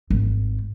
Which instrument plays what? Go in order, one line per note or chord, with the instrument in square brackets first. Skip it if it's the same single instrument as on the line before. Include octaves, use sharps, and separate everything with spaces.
[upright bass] G#1